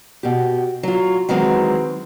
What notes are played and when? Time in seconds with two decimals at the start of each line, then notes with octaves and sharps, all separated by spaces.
0.23 B2 G4
0.83 F#3 F4
1.29 D#3 E3 F#3 G#3 C4